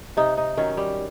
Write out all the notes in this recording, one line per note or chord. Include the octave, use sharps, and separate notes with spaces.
C3 D#4
D#4
D#3 F#3 C#4
G3